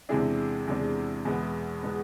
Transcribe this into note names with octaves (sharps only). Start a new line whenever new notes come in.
E2 C3 G#3 D4 E4 G#4
E2 C3 G#3 D4
E2 B2 G#3 B3
B2 G#3 B3